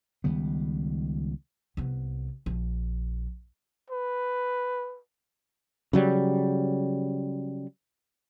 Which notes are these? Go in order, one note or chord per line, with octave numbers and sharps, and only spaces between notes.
C#2 D#3 G3 B3
C2 B3
A#1
B4
C#3 F#3 G3